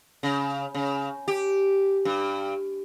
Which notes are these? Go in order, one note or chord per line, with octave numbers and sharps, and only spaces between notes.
C#3
C#3
G4
G2